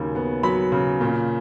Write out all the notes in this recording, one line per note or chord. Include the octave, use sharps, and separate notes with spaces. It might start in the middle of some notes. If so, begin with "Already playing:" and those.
Already playing: D#2 C#3 F#3
B3
F#3 B5
C#3
A#2